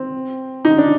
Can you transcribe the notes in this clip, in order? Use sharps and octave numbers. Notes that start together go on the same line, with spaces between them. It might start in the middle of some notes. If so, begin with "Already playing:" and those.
Already playing: C4
D#4
D4